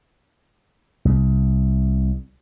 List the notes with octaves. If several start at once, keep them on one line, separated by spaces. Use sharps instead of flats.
C2